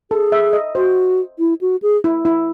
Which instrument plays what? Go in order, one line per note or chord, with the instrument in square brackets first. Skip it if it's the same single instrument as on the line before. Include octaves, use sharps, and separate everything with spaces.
[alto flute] G#4 [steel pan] A4
[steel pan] E5
D#5
[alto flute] F#4 [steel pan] C5
[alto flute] E4
F#4
G#4
[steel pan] E4
E4